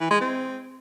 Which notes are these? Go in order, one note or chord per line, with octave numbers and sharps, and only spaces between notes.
E3
G#3
C4